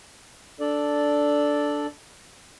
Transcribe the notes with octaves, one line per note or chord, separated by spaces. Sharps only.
D4 A4 D5